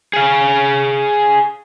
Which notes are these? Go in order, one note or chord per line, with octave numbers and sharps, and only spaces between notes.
G#4 F5